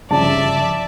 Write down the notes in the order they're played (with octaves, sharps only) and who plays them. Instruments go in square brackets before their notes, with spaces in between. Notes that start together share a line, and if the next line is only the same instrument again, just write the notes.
[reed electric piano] G2 C#3 F3 [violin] D5 E5 [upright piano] A5